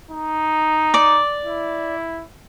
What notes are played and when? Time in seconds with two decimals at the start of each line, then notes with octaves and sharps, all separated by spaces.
0.11 D#4
0.94 D5 D6
1.45 E4